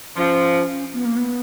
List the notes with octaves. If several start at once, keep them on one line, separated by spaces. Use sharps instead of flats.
F3 C#4
B3
A#3
B3